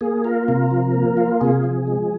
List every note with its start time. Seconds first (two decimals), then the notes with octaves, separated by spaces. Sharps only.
0.01 A#3 G#4
0.24 F4 A#4
0.48 C3 A#4
0.71 F3
0.94 A#3
1.17 F4
1.41 C3 G#4
1.64 F3
1.87 G#3